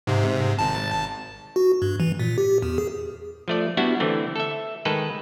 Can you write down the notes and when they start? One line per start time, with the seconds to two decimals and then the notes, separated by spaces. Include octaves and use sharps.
0.07 G#2 C3
0.59 G#1 A5
1.56 F#4
1.82 G2
2.00 E3
2.19 A#2
2.38 G4
2.62 E2
2.78 G#4
3.48 F3 A3 D5
3.77 G3 B3 D4 E4 F#4
4.00 D3 E3 A3 C4
4.36 A4 E5
4.85 D#3 G#3 A4 B4 G5